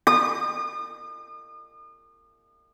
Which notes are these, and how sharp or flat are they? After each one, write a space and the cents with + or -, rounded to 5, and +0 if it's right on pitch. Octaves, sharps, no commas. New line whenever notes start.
D#6 -40